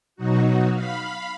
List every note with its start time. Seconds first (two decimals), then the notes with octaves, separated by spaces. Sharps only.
0.16 B2 F#3 D#4 F#4
0.72 F5 B5